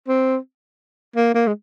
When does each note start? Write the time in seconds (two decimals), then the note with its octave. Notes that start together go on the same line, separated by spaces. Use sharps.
0.08 C4
1.16 A#3
1.34 A#3
1.47 G#3